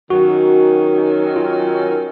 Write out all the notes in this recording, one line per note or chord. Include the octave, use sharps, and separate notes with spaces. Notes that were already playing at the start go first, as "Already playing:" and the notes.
D#3 F#3 C#4 F#4
F4